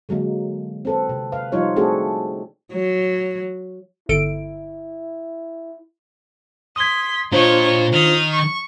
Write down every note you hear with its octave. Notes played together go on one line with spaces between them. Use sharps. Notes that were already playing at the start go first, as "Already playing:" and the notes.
D3 F#3 G#3 A#3
C4 A4 B4
C3
B4 F5
F3 G3 D#4 F4 C#5
A3 C4 D4 F#4 G#4 A4
F#3
G1 E4 A4 D7
C6 D#6 G#6 B6
A#2 D4 F4 C5 C#5 D#5
D#3 D#6 F6
C#6